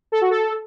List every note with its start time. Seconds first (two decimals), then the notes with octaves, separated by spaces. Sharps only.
0.12 A4
0.21 F#4
0.31 A4